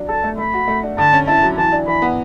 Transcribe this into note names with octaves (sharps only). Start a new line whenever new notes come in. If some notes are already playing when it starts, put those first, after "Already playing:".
Already playing: F#3 D4
A4 A5
A3
A3 B5
F#4
A3
D4
D3 A5
C#4
E4 A5
F#3
E3 A5
D4
E3 B5
B3